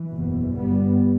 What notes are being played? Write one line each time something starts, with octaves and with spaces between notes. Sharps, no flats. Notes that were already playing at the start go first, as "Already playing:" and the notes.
Already playing: E3
F#1 E2 B2
G1 G2 G3 B3